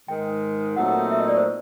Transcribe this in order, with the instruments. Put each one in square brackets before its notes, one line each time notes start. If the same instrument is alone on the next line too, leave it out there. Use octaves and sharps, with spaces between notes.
[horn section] G#2 D#3 G#3 [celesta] G5
[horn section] A#2 F#3 A3 C4 D#4 [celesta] F#5
[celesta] E5
D#5
D5
C5